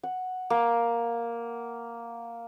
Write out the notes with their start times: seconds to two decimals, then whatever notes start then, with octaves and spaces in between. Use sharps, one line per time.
0.03 F#5
0.50 A#3